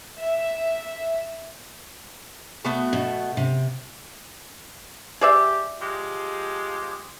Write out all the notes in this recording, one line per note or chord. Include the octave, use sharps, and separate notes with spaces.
E5
A3 B3 F#4
B2
C3
G4 G#4 D5 E5
F3 G#3 G4